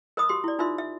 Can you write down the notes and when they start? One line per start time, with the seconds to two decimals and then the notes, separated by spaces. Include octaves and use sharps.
0.17 A#4 C5 D#5 B5 D#6
0.29 F#4 G4 C6
0.44 E4 D5
0.59 D#4 F4 A#4 C5 E5 C6
0.78 E5